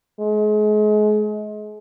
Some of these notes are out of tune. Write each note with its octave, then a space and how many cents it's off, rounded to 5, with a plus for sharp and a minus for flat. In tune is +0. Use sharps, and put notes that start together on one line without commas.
G#3 +35